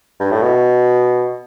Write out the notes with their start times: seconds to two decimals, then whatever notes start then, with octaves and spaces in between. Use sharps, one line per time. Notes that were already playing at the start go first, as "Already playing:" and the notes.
0.20 G2
0.31 A2
0.43 B2